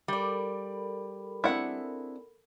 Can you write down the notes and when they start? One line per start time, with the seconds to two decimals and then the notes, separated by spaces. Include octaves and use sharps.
0.08 G3 A4 A#4 D5 B5
1.44 C4 D4 E4 G#4 F#5